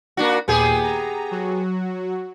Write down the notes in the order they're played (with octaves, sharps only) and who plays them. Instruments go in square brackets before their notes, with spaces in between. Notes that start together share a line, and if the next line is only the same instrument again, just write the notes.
[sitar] A#3 D4 F#4
[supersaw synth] D#2 A#2 G6 [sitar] B3 G4 G#4
[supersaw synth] A#5
F#3 F#4